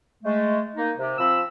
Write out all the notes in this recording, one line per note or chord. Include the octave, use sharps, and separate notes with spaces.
G#3 A3
A#3 D#4
C3
F3 C4 B5 E6